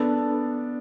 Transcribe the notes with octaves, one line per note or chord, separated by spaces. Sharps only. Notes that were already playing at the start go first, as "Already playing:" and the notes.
Already playing: B3 D4 A4